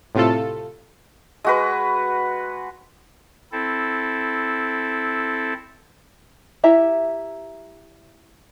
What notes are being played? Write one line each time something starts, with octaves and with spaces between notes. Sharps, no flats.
A2 C3 A3 F4 A4
G#3 F#4 B4
C4 E4 A4
E4 G4 E5 A#5